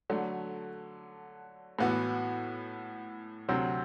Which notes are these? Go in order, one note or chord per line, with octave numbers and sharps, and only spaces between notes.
D3 F#3 A3
A2 E3 B3 F#4
D2 C3 F#3 C4